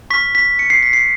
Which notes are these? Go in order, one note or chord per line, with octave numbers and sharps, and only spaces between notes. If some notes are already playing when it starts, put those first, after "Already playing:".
C#6 F6 B6
B6
C#7
C7
B6
C7